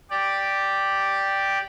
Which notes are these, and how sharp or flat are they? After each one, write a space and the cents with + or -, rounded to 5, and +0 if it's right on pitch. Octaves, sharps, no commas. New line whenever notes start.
G4 +0 D5 +0